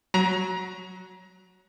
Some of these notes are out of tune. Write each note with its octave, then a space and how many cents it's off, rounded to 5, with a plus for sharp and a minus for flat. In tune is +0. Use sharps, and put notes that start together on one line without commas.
F#3 +0 A#5 +30